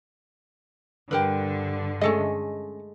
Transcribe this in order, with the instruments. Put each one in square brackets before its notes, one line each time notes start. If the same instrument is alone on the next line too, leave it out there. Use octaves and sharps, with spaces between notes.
[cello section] G2 D3 [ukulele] G4 A#4 B4
[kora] G#3 A3 [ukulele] C#4 A4 D#5